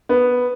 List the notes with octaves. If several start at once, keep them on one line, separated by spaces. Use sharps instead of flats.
B3